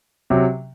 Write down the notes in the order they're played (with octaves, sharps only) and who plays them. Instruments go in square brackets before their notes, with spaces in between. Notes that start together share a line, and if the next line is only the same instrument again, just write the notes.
[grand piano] C3 F#3